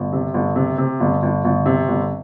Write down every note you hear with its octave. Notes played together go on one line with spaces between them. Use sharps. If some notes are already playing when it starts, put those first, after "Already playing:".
Already playing: G1
C3
G1
C3
C3
G1
G1
G1
C3
G1